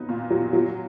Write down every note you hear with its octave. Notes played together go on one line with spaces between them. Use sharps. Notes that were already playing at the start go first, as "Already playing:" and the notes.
Already playing: F#3 B3 D#4
A#2
F#3
F#3